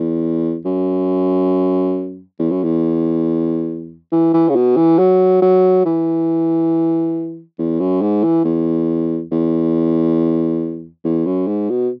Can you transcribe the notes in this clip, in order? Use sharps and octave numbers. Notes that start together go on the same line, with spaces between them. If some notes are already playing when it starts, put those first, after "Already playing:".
Already playing: E2
F#2
E2
F#2
E2
E3
E3
C#3
B2
E3
F#3
F#3
E3
E2
F#2
G#2
E3
E2
E2
E2
F#2
G#2
B2